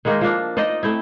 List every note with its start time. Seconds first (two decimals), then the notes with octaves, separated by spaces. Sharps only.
0.05 D#3 G#3 A#3 D#4
0.21 F3 A#3 D4
0.57 D#4 C5 D5 D#5
0.83 A3 C4 E4